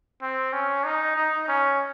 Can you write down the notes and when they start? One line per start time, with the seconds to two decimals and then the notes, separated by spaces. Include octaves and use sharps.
0.21 C4
0.53 C#4
0.84 D#4
1.16 D#4
1.48 C#4